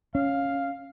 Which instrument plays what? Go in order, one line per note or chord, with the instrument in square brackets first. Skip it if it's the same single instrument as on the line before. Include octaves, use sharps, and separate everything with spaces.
[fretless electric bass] C#4 [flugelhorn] F5